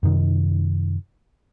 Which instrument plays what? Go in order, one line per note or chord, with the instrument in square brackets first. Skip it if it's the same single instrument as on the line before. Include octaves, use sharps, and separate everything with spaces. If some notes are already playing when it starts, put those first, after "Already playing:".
[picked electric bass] F#2 C3 D#3